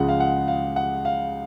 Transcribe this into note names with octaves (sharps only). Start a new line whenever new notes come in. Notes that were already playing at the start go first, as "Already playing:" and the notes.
Already playing: C#2 C#3 F3 G#3 F#5
F5
F#5
F5
F#5
F5